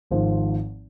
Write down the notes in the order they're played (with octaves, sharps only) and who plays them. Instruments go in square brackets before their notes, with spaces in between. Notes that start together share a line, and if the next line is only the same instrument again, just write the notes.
[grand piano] G#1 G#2 F3 C5